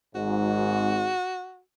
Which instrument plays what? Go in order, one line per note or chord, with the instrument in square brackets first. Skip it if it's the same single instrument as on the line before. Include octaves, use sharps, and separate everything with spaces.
[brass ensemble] G#1 G#2 [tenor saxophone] F#4